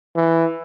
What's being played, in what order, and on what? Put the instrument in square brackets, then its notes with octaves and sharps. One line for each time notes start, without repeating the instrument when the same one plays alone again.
[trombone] E3